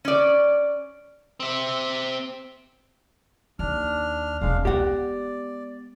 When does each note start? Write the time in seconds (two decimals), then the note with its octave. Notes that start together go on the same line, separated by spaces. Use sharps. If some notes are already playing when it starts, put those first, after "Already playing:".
0.05 C#4 D5
1.40 C4 E5
3.59 D#2 D4 F6
4.41 E1 G#3 C4 D4 F5
4.65 G#3 B3 G4 D5 F#5